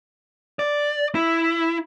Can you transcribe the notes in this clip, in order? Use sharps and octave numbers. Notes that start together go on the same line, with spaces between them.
D5
E4